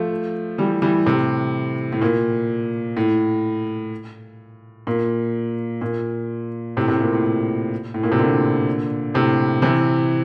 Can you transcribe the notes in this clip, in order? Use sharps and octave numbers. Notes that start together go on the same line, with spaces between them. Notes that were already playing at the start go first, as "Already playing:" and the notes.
Already playing: F3 A3
E3 G3
E3 G3
A2 C3
A2
A#2
A2
A#2
A#2
A2 C3
A2 C3
A#2
A2
A2
A#2
C3
A#2 D3
A2 C3
C3 E3